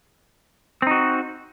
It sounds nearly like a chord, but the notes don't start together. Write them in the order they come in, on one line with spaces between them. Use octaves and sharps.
C4 D#4 F#4